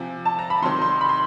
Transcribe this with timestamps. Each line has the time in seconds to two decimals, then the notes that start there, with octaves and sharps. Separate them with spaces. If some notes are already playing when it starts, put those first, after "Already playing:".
Already playing: C3 F3 G#5
0.25 A5
0.39 A#5
0.50 B5
0.62 C3 D#3 F#3 C6
0.82 C6
1.01 B5
1.09 C6